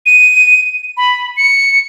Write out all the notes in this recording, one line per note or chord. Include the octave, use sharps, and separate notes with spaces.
D#7
B5
C#7